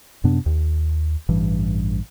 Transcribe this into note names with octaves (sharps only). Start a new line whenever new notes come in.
F#2 C3 B3 D4
D#2
A1 G2 E3